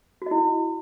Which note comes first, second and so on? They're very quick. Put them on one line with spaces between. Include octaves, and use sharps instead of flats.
F#4 D#5 E4